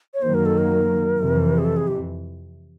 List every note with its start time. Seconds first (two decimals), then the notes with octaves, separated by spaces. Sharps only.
0.14 C#5
0.22 F#2 D#3 F#3 A#3 C5
0.34 A#4
0.46 A4
0.58 A#4
1.17 F2 C3 E3
1.58 G#4
1.64 A4
1.77 G#4
1.88 G4